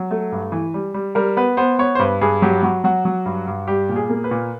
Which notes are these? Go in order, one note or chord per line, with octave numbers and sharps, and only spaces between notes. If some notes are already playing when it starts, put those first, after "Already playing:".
Already playing: F#3
A3
G2
E3
G3
G3
G3 A#4
B3 B4
B3 C5
B3 C#5
C5
G2 B4
G2 G#4
F#3 G4
F#3 F#4
F#3 F#4
F#3
G2
G2
G3 G4
A#2
G#4
A#3
B4
A#2